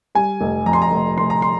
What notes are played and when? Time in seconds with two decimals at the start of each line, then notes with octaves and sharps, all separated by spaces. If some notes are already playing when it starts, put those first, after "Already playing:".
0.15 G3 G#5
0.41 F1
0.66 F2 A#5
0.73 C6
0.82 A#5
0.91 F1
1.18 F1 C6
1.30 A#5
1.42 C6